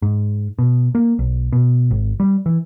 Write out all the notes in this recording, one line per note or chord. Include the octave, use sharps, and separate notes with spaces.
G#2
B2
A#3
B1
B2
G#1
G3
E3